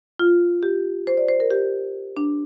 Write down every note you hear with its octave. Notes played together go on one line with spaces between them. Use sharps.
F4
G4
C5
D5
C5
A#4
G4
D4